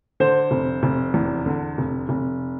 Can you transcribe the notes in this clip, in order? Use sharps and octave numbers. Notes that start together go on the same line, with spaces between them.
D3 C5
F1
F1
E2
D3
F1
F1